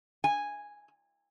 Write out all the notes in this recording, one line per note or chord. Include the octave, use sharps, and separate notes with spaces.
G#5